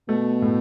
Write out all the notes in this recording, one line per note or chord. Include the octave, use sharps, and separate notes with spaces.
B2 A3
A2